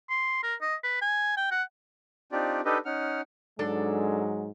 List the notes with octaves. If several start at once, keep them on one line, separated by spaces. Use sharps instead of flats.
C6
A#4
D#5
B4
G#5
G5
F#5
C4 D4 D#4 F4 G4 D5
D4 D#4 G4 A4 B4 D#5
C#4 D#4 F#5 F6
G#2 F#3 G#3 D4 A4